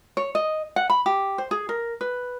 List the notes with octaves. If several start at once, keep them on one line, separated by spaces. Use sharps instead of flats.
C#5
D#5
F#5
B5
G4
C5
G#4
A#4
B4